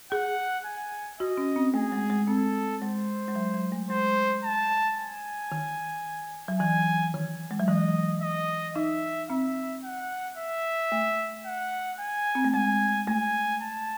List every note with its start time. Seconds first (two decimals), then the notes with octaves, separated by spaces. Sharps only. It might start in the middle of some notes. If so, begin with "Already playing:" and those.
0.12 G#4 F#5
0.66 G#5
1.20 F#4 D#5
1.38 C#4
1.56 C4
1.74 A3 G#4
1.92 G#3
2.10 G#3
2.27 C4 A4
2.82 G#3 C5
3.28 G#3
3.36 F#3
3.54 F#3
3.72 A3
3.90 G#3 C5
4.44 A5
4.98 G#5
5.52 D#3
6.48 F#3
6.60 E3 G#5
7.14 D#3
7.51 G#3
7.60 F#3
7.68 E3 D#5
8.21 D#5
8.76 D#4 E5
9.30 C4 E5
9.84 F#5
10.38 E5
10.92 A3
11.46 F#5
11.99 G#5
12.35 C4
12.44 A3
12.54 G#3 G#5
13.07 A3 G#5
13.62 A5